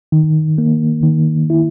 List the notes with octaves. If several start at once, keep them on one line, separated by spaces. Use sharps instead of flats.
D#3
A#3
D#3
E4